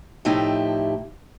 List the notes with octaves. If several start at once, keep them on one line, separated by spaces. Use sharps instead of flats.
A2 F3 A3 D#4 E4 G4